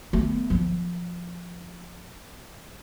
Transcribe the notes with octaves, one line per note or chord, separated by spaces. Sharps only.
A3 B3
F3